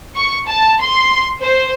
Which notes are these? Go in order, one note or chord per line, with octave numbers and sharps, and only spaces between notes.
C#6
A5
C6
C5